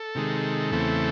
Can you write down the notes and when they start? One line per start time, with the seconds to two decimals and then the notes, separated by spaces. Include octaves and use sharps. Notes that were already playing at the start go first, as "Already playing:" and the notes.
Already playing: A4
0.15 C3 D#3 G#3
0.71 E2 C#3 E3 A3 C4